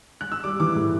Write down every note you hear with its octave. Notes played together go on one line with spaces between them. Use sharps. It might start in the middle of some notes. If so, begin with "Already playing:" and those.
F#6
E6
G3 D6
E3 D6
A2